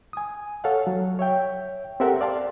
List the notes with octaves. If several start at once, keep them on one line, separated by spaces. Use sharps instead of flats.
G#5 D#6
A4 C#5 F5 F#5
F#3
C#5 E5 G5
C4 G4 A4 A#4 E5 F#5
D5 F5 A5 C6